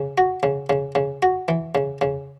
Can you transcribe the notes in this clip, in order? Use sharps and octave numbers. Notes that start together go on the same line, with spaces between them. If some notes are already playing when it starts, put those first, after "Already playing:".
Already playing: C#3
F#4
C#3
C#3
C#3
F#4
E3
C#3
C#3